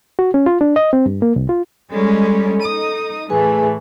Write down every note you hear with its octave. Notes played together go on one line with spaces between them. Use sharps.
F#4
C#4
F4
D4
D#5
C4
G2
A#3
C2
F4
G3 G#3 C#4 A4
D#4 D#6
A2 E3 A3 G#4 B4 G#5